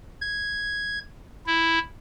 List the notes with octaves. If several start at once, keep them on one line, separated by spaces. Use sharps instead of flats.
G#6
E4